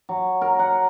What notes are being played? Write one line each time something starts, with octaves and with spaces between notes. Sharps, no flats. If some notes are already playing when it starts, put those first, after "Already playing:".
F#3
A#4
F#5